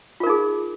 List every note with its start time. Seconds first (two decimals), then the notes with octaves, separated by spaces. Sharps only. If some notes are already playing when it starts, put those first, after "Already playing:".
0.20 F4
0.23 A#4
0.26 D#4
0.30 G#4